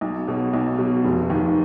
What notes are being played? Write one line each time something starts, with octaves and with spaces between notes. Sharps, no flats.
B1
B2 F#3
B1
B2 F#3
F1
D#2 D#3